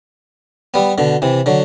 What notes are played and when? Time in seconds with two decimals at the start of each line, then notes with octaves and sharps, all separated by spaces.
0.74 G3 B3
0.98 B2 D3
1.22 C3 E3
1.46 D3 F#3